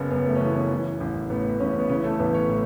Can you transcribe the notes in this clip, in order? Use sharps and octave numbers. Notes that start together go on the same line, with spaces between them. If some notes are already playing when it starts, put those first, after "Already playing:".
Already playing: F#1 C#3 B3
F#2 B3
A3
C#4
E3 B3
B3
E3
A1
A2 B3
A1 C#3 C#4
B3
C#3 E3 C#4
A3 A4
A1 B3 B4
C#4 C#5
A2